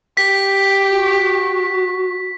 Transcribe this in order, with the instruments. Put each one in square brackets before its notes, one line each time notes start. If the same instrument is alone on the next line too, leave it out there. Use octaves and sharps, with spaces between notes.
[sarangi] G4 [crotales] B6
[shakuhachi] F#4